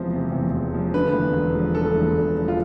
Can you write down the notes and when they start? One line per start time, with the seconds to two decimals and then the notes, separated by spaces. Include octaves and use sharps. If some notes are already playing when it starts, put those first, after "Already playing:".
Already playing: E1 E2 C3 F3 C5
0.13 C3
0.32 E2
0.53 E1
0.74 F3
0.94 D3 B4
1.13 E2
1.33 E1
1.54 F3
1.75 D3 A4
1.95 E2
2.16 E1
2.35 F3
2.48 F4